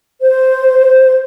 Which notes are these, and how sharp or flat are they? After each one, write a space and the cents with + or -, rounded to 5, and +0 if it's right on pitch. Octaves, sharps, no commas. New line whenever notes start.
C5 -5